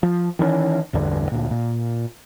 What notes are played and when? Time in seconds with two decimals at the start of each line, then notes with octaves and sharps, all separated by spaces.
0.03 F3
0.39 D#3 E3 G3 C#4
0.93 A1 E2 G2 D3
1.32 D2 A#2
1.51 A#2